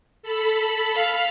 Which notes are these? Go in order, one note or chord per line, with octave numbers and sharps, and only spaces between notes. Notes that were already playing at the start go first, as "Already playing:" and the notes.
A4 B5
F5